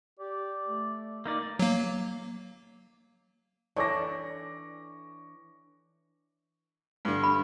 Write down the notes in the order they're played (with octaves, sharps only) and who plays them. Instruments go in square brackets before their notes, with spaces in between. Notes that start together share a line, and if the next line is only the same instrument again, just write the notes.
[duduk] G4 [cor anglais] D5
[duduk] A3
[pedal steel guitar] A#3 D#4 D5
[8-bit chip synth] F#3 A#3
[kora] E3 D4 A4 [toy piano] C#5 D5 [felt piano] C#6 D6 A#6
[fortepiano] G2 D3
[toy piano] B5